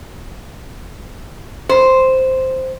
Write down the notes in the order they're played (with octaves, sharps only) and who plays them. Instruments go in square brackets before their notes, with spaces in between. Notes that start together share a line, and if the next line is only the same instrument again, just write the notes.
[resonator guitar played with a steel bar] C5